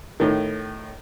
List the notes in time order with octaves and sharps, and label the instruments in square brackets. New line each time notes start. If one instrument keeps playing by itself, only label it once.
[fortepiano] A2 D#3